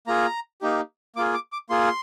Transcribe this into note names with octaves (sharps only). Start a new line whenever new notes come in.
A#3 F4 G#4 A#5
A#3 D#4 G4
A#3 F4 G#4 D6
D6
D6
A#3 F4 G#4 C6